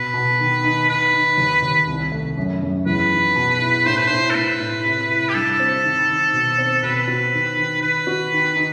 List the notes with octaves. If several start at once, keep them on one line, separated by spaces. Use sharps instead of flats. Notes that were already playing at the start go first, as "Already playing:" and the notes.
Already playing: B2 B4
B2
D#3
D#4
D#3 B4
D#4
D#2
D#2
C2
A3
F#2
F#2
E2 B4
D#4
B2
E4
A2 C5
B4
A2 C5
A4
A2 B4
A2
C3
E4
G4
G2 A4
C4
D#3
D#3
B2
C4
B2 B4
F#4
D#3
D#3
D#3 B4
F#4
D#3
D#4